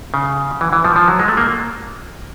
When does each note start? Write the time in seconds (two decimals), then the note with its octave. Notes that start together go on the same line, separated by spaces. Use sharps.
0.14 C#3
0.61 E3
0.73 E3
0.84 F3
0.96 F3
1.08 F#3
1.19 G#3
1.28 A3
1.37 A#3